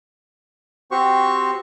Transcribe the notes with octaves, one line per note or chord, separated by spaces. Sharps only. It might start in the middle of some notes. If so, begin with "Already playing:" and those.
C4 F#4 G4 C5 C#6